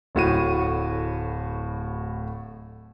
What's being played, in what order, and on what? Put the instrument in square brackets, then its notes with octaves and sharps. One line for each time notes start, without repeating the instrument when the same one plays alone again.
[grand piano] D1 A2 F#4 D#7